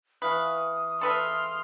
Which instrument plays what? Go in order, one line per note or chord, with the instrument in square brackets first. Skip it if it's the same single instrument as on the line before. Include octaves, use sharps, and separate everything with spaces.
[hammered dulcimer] E3 F5 C#6 [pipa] B4 [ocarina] D#6
[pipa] A4 B4 E5 [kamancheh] C6 F6